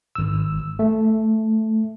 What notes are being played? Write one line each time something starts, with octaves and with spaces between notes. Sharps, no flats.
G#1 E6
A3